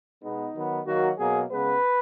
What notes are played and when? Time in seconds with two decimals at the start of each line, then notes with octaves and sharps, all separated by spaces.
0.23 B2 G#3 B3 D#4
0.54 D#3 F#3 B3
0.86 D#3 F#3 A#3 F#4
1.18 B2 F#3 A#3 G#4
1.50 C#3 G#3 B3 B4